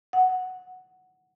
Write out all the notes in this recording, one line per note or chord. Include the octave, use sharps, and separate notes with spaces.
F#5